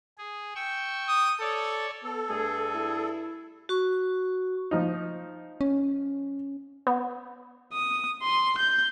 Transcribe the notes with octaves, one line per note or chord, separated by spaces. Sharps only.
G#4
G5 C#6 E6
D#6
A4 C#5 D5
B3 A4
G2 A3 G#4
E4
F#4 C#6
F3 D#4
C#4
B3
D#6
C6
G6